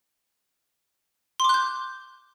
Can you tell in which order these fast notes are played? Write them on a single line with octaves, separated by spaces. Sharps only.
C6 D6 F#6 G6